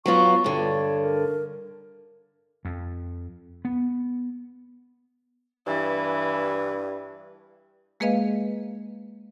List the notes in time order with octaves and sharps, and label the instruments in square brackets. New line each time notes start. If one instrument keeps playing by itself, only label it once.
[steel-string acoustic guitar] F#3 B3 F4 [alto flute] C#6
[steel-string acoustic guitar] G2 D3 [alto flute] C#5
[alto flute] A#4
[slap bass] F2
B3
[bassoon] G2 [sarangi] E3
[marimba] G#3 A#3 G#4 B4 D#5 F5